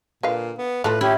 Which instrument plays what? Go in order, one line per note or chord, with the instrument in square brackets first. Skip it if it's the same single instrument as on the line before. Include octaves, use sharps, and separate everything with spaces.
[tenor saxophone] A#2 [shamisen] D3 B4 F5
[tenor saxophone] B3
[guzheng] A2 [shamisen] F4 A4 [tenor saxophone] B4
[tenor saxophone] C#4 [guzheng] E4 [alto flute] G4